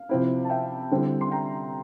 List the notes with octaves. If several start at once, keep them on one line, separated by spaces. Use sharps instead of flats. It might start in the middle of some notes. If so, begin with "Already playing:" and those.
Already playing: F5
C3 F3 C4 E4
A5
E5 G5
D3 G3 C4 E4
C6
G5 A#5